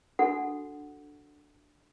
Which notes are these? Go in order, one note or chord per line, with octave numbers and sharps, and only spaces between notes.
D4 F#4 A4 F#5